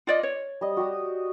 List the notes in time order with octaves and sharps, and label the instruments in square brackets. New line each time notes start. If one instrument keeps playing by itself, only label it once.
[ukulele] F4 D5 D#5
C#5
[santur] G3 D#5
F#4 G4 D#6